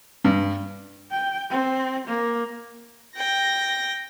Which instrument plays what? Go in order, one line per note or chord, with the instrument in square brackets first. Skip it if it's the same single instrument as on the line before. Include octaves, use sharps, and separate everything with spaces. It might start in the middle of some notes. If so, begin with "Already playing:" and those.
[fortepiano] G2
[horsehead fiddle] G5
C4
A#3
[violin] G5 A#6